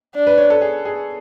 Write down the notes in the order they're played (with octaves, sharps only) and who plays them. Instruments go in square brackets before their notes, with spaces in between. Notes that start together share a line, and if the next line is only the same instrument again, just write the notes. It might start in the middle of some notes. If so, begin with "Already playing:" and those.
[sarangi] D4
[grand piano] B4
C#5
A4
G#4
G#4